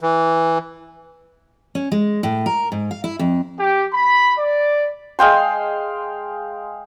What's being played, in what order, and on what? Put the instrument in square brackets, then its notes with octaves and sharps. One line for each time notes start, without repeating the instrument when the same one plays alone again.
[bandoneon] E3
[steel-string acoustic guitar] C#4
G#3
A2
A#4
G#2
F5
E4
F2
[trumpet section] G4
B5
D5
[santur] G#3 F5 G5 C6